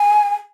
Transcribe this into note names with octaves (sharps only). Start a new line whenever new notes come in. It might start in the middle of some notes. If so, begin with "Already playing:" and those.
Already playing: G#5